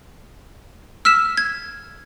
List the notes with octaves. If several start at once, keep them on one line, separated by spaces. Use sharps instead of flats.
E6 F6 B6 E7
G#6